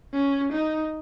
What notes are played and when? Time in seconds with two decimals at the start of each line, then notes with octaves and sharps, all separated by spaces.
0.14 C#4
0.53 D#4